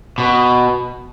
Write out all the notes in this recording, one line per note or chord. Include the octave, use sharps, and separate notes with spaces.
B2